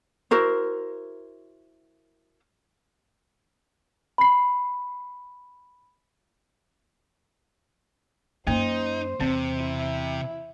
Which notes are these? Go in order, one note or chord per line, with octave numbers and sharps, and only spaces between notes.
E4 F#4 A#4 C5
B5 C7
F#2 A#3 D#4 C5
E2 C3 C4
E4